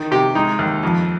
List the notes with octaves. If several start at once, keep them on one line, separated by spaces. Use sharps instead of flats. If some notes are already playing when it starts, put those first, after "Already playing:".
Already playing: D#3
C3 G4
G#3 D#4
D#2
F2